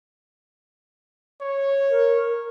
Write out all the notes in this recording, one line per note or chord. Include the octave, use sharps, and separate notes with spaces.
C#5
A#4